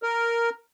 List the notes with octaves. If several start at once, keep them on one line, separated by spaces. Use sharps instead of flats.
A#4